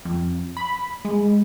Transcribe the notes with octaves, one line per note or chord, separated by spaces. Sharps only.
F2
B5
G#3